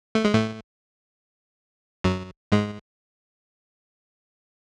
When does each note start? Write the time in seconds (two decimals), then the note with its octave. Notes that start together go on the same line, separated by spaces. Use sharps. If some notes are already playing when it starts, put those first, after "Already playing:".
0.15 A3
0.25 G#3
0.33 A2 A3
2.04 F#2 F#3
2.52 G#2 G#3